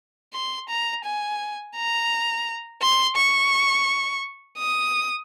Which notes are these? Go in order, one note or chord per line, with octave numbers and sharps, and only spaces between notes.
C6
A#5
G#5
A#5
C6
C#6
D#6